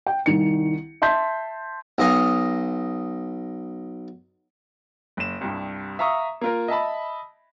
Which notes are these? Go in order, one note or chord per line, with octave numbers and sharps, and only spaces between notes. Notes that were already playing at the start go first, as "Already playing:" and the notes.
G5
C2 D#3 C#7
E5 A5 C6 G6 B6
B1 D#5 F5
F#1 E7
C2 G2
E5 F5 A#5 C#6 D#6
A#3 F4 A#4
D#5 E5 A5 B5